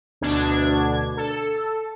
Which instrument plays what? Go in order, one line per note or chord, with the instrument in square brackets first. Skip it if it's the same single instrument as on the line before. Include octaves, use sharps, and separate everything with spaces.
[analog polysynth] D2 B2 D4 G#6
A4